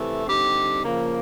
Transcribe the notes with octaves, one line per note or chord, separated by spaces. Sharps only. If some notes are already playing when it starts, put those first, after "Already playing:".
Already playing: C3 E3 A3
D3 G3 C4 D#4 G4
C#3 F3 A#3